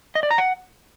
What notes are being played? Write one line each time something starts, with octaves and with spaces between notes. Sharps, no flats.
D#5
D5
A#5
F#5